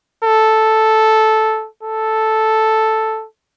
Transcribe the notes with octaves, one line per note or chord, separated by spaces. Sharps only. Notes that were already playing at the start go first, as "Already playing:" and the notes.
A4
A4